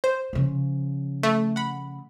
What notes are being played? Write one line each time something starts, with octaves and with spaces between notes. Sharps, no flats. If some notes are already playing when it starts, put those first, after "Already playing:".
C5
C#3 F3
A3
F#5 B5